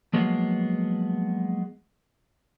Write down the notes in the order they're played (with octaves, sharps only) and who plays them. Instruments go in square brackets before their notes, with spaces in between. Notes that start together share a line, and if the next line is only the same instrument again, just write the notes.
[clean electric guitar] F3 F#3 G#3 A#3 B3